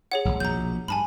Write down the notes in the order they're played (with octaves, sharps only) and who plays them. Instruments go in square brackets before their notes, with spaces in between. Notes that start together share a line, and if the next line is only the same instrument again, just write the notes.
[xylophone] G#4 C#5 F#5
[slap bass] D#1 G#1
[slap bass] A#1 B2 [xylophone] A#5 G6
[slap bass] G2 [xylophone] G#5 A5 B5